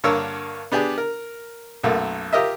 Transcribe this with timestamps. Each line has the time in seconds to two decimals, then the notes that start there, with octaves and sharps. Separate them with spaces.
0.04 G2 D3 A#3 A#4 C#5 E6
0.72 B3 D4 G4 G#4
0.98 A#4
1.83 B1 F#2 A3 A#3
2.33 F4 G4 A#4 D#5 E5